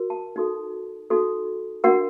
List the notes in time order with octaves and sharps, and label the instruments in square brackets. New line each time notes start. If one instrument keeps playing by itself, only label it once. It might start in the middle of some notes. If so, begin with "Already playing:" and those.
Already playing: [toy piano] F#4 A#4
A5
D#4 F#4 A4
D#4 F#4 A4
D4 F#4 A#4 F#5